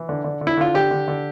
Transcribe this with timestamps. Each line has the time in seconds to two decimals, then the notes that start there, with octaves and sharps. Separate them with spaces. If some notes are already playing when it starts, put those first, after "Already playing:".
Already playing: E3
0.09 D3
0.24 D3
0.41 D3
0.47 E4
0.57 D3 F4
0.74 D3 G4
0.91 D3
1.08 D3